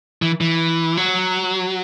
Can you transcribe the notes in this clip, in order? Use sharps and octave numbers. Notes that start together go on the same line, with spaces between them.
E3
E3
F#3